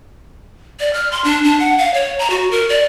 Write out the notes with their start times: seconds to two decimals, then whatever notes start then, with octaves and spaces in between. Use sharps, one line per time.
0.80 D5
0.94 F6
1.12 C6
1.24 D4
1.44 D4
1.60 F#5
1.78 F5
1.94 C#5
2.19 A#5
2.30 F#4
2.51 A#4
2.69 D5